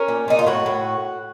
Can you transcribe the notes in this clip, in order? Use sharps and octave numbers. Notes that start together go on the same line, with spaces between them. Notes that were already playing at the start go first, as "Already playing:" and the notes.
Already playing: C#4 A#4
A#2
A#2 D#4
F4
A2 F#4
A2